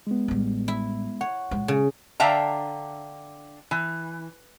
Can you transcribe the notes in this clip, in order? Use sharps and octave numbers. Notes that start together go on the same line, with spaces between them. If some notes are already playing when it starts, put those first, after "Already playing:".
G#3 B3
A1 G3
E4
C#5 F#5
A#2 G#3
C#3
D3 D4 E5 F5 G5 A#5
E3